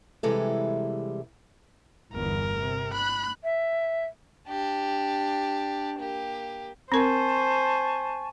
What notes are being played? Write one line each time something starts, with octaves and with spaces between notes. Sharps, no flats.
C3 E3 G3 G#3 E4 A4
G1 E2 A#4
C3
B5 F#6
E5
D4 G4
A#3 G4
C4 A#4 C5 G#5 A5 C#6